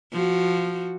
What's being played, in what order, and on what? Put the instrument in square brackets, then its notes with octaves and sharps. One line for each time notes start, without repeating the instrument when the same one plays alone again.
[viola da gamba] F3 F#4